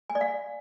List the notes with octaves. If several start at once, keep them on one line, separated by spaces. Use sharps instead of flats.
G#5
D5
F5